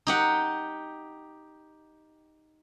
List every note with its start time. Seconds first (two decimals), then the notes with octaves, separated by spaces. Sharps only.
0.07 D#4 G4 F#5